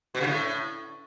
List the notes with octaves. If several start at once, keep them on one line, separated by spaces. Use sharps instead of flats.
B2
C#3
A2